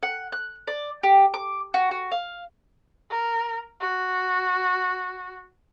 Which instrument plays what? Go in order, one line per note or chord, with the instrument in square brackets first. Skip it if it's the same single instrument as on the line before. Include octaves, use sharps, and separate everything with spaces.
[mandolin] F#5
F#6
D5
G4
D6
F#4
F#4
F5
[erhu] A#4
F#4